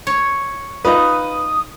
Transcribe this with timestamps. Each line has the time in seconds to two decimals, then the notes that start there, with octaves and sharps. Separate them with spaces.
0.07 C#5
0.85 D#4 F4 B4 D#6